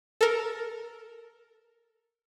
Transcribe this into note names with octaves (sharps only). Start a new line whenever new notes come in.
A4 A#4